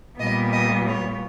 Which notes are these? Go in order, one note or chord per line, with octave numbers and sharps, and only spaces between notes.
A#2 G3 B3 D#5
D#5
C#5